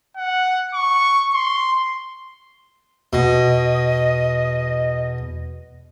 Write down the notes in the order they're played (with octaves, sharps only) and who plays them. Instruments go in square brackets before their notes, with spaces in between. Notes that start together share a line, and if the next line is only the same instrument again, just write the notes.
[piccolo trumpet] F#5
C#6
C6
[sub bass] E2 [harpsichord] B2 [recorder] D#5